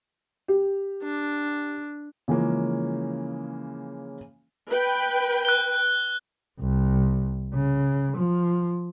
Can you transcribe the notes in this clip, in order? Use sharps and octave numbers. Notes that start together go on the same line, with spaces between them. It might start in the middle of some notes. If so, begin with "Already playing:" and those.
G4
D4
C#3 E3 F3 G#3 A#3 C#4
B4 G5
F#6 G7
C2
C#3
F3